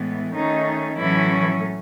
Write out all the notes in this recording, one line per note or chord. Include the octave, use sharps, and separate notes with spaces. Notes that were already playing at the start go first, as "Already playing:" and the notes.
Already playing: A2 E3 G#3 B3
D#3 A3 C#4 D#4
A2 E3 F#3 A3 C#4 E4